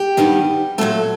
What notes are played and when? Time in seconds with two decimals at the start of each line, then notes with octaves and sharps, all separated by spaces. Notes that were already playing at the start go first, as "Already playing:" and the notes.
Already playing: G4
0.17 G2 D#3 G3 B3
0.78 A#2 F#3 A3 A4